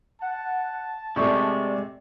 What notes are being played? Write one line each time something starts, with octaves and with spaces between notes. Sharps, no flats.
F#5 A5
C3 G#3 A3 D5 C#6